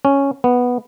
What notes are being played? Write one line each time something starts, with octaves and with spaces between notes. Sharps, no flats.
C#4
B3